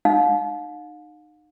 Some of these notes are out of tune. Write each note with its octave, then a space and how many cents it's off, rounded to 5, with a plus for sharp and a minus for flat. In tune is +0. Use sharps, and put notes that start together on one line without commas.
D#4 -25 F5 +40